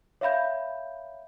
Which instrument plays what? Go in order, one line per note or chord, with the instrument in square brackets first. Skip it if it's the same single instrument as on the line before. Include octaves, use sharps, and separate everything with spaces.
[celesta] C#5 E5 F5 B5 G6